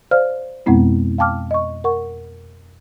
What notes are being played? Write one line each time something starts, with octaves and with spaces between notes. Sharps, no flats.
C5 D5 F5 F6
F2 B2 G#3 B3 C4 E4
F5 G5 A5 D6 F6
D#5 C#6
A#4 F#5 C#6